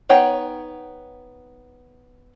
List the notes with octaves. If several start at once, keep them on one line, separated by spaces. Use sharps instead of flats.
B3 D#4 C#5 F#5 G5